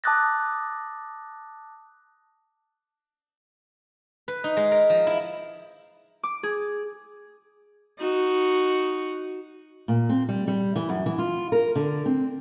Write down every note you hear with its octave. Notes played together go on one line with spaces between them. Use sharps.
A5 D6 D#6 F#6 A6 A#6
B4
D#4
G#3
A#4
F3
E4
D6
G#4
D#4 F#4
A#2
C4
G3
G3
E3
F#2
E3
F4
A#4
D3
C4